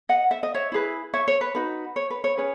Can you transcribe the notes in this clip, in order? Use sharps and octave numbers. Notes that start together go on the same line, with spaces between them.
D#5 F#5
E5
D#5
C#5 E5
E4 G#4 B4
C#5 E5
C#5
B4
D#4 F#4 B4
C#5
B4
C#5
C#4 G#4 B4 C#5